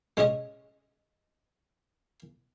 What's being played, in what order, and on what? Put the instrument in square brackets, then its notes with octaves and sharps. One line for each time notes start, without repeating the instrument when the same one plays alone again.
[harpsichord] G#3 C#4 G#4 D#5